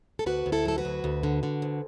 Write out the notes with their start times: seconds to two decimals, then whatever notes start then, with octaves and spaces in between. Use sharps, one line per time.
0.19 A4
0.26 D2 F#4 B4
0.46 D2
0.52 E4 A4
0.65 F#3 A4
0.78 F#4 B4
0.85 D2
1.04 D2
1.23 D3
1.43 D3
1.62 D2